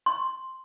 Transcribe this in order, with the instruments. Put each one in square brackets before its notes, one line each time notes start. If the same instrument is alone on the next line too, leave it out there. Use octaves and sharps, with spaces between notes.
[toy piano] C6